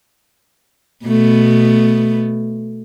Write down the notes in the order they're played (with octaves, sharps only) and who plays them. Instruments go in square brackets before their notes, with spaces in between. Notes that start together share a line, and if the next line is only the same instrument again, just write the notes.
[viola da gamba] B2 A3 B3